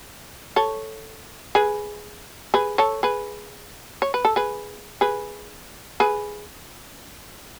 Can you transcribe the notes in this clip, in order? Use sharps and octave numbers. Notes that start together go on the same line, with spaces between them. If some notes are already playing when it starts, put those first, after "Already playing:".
A4 C#5
G#4 B4
G#4 B4
A4 C#5
G#4 B4
C#5
B4
A4
G#4 B4
G#4 B4
G#4 B4